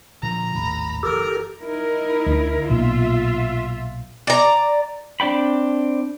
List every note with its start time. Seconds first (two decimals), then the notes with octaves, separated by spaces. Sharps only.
0.23 A#2 D3 F3 A#5
0.55 G#1 D#2 A2 B5
1.03 F#1 E3 G4 A4 A#4
1.61 D#4 E4 A#4
2.26 D2
2.70 B1 A#2 F4 E5
4.27 D5 A#5
5.20 C4 D4 D5 G5 B5